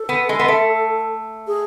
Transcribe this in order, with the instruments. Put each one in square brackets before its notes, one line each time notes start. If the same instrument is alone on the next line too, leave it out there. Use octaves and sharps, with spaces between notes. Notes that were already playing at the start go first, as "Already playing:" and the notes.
Already playing: [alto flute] A4
[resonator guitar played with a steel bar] B3
G#3
B3
A3
[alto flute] G#4